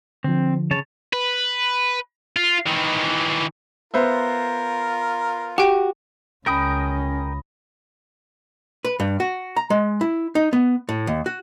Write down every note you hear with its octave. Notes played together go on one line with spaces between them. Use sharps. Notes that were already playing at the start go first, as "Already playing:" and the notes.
D3 F3 C4
C#3 C#5 A5
B4
F4
D#3 E3
B3 F4 A#4 C5 E5
F#4 G4 G5
C#2 C#4 A#4 D#5 G5 B5 D#6
B4
G2
F#4
A#5
G#3
E4
D#4
B3
A2
D#2
F#4